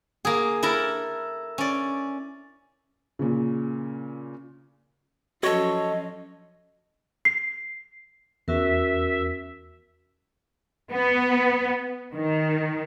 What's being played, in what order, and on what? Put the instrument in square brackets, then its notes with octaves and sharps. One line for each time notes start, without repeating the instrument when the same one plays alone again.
[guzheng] A#3 G#4
E4 A4 A#4
C#4 D5
[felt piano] A#2 C#3
[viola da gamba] F3 F#3 C#4 [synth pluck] F#4 [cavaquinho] A4 C#5 [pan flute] D#5
[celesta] C7
[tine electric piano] E2 [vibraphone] C#4 F#4 A#4 [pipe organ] E5
[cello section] B3
D#3